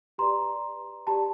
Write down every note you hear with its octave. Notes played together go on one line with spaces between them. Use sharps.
G4 B4 D5 A#5 C6
G4 B4 D5 A5 B5